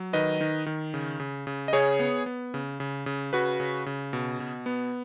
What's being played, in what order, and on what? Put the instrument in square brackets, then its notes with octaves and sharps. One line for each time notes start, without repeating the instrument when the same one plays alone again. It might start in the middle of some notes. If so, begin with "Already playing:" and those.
Already playing: [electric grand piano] F#3
D#3 B4 D#5
D#3
D#3
C#3
C#3
C#3
D#5
C#3 G#4 C#5
B3
B3
C#3
C#3
C#3
C#3 F#4 B4
C#3
C#3
B2
B2
B3